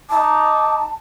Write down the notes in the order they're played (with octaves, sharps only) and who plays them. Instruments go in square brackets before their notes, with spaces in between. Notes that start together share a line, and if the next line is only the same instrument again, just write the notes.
[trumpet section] D#4 D6 [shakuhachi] A5